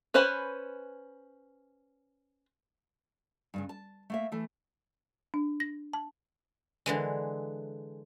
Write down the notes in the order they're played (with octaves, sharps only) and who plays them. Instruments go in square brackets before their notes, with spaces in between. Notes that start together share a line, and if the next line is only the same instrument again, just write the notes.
[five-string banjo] C#4 B4 C5 G#5 B5
[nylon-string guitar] G2 A#2 C#3
A5
A3 A#3 E5
E3 A3
[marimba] D4
A#6
A5
[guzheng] D3 E3 G#3